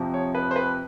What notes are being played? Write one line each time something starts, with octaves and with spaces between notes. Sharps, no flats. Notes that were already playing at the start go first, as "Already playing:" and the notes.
Already playing: F2 C3 F3
C#5
B4
C5
B4